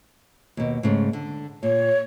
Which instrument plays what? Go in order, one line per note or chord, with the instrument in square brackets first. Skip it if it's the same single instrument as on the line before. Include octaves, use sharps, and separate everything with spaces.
[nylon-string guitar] D#2 B2
G#2 C#3 A3
D3
[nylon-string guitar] A#2 [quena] C#5